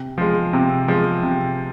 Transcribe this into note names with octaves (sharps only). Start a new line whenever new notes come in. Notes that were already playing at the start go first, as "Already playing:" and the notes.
Already playing: C3
F3 G#3
C3
F3 G#3
C3